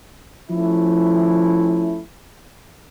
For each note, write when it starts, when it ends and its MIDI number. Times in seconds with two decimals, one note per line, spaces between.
0.50 2.01 53
0.50 2.01 57
0.50 2.01 61
0.50 2.01 64